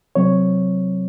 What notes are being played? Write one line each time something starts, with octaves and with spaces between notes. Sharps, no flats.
C3 F#3 C4 C#5